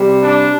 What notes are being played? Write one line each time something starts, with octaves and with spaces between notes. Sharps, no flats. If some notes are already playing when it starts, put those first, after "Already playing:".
Already playing: C3 G3
D4